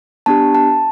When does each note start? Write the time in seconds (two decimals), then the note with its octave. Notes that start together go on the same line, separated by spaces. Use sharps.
0.26 B3 D4 G4 A5
0.55 A5